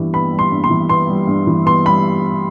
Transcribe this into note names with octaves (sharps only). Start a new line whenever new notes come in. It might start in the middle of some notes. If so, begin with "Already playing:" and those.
Already playing: G2 E3 G3 B3
B3 B5
G3
C6
G2
C6
E3
B3 C6
G3
G2
E3
B3 C6
G3 B5